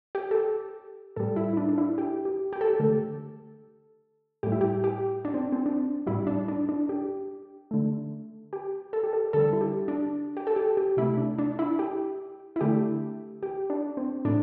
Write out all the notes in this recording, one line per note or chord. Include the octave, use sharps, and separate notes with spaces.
G4
A4
G4
A2 G3 A4
E4
E4
D4
D4
E4
G4
G4
G4
A4
G4
D3 A3 A4
A2 G3 G4
E4
G4
G4
D4
C4
C4
D4
A2 G3 E4
D4
D4
D4
G4
D3 A3
G4
A4
G4
A4
D3 G3 A4
E4
G4
D4
G4
A4
G4
G4
C3 A3 E4
D4
D4
E4
G4
E4
D3 A3 G4
G4
D4
C4
A2 D4